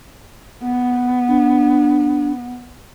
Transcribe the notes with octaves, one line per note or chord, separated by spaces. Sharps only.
B3
D4